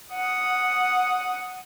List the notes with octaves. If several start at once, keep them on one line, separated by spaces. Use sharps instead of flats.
F#5 D#6